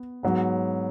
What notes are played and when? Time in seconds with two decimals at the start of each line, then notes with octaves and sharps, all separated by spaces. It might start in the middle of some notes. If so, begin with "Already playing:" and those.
Already playing: B3
0.23 G#2 F#3 B3